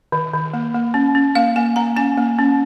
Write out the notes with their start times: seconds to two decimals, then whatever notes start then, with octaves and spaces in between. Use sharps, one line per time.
0.12 D#3
0.33 D#3
0.53 A#3
0.75 A#3
0.94 C#4
1.15 C#4
1.35 A#3 F5
1.56 A#3 G#5
1.76 A#3 A#5
1.96 C#4 G#5
2.18 A#3
2.38 C#4